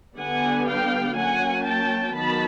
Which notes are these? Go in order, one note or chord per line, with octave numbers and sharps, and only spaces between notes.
D3 G3 B3 D4 F#5 G#5
F5 G5
F#3 A#3 C#4 F#5 G#5
G5 A5
D#3 F#3 B3 A5 B5